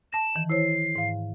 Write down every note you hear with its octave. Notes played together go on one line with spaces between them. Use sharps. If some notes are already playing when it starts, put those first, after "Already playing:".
A5 A#6 E7
D#3 E3
E4 C5 C#5 C7
G#2 F5